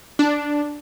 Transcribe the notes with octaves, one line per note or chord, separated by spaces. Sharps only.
D4